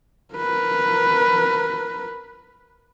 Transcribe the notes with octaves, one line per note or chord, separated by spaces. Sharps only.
A#4 B4